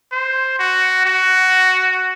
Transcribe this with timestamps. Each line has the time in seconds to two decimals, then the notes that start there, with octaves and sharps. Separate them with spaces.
0.12 C5
0.59 F#4
1.05 F#4